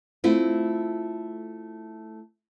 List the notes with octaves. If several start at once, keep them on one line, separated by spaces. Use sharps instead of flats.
A3 C4 E4 F4